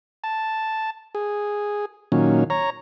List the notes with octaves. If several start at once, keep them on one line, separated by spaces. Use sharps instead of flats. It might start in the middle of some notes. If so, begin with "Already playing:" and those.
A5
G#4
A#2 D#3 F#3 C#4
C#5 A#5